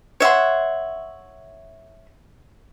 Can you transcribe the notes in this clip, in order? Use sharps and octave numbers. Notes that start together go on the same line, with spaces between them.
C#5 E5 F#5 C6